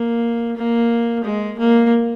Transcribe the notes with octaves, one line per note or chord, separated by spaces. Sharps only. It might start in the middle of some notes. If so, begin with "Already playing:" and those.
Already playing: A#3
A#3
G#3
A#3